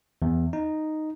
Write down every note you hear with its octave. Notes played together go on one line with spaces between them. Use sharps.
E2
D#4